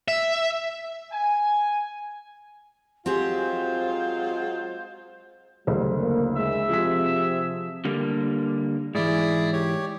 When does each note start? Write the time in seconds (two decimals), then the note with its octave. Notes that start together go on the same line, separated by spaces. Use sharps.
0.08 E5
1.12 G#5
3.06 F#3 G#3 C4 F4 G4 G#4 C5
5.67 F#1 D2 G3 C5
5.97 A#3
6.36 G#3 E5
6.69 C3 F3 G#4 B6
7.85 D3 G3 A#3
8.95 G#2 E3 E4 G#4 D5
9.53 G4 C#5